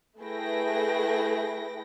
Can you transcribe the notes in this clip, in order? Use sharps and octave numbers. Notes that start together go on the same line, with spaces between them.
A3 E4 G#4 B4 G5 A#6